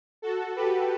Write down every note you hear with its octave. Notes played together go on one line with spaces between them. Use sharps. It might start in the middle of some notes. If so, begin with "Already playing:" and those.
F#4 A4
G4 B4